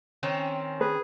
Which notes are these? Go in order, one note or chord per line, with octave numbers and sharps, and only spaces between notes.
D#3 C4 C#4 C#5
G#4 B4